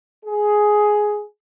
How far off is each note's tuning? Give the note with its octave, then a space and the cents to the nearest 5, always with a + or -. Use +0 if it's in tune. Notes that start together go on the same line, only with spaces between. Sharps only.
G#4 +10